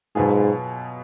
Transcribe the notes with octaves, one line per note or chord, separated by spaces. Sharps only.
G#2 B2 F#3 B3 F4 G#4